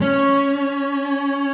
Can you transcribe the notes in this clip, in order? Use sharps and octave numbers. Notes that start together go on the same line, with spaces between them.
C#4